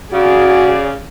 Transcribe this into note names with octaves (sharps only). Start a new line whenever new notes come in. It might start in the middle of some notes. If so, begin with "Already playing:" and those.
C#3 F#4 G#4 D5